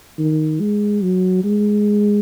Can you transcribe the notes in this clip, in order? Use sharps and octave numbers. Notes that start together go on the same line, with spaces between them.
D#3
G#3
F#3
G#3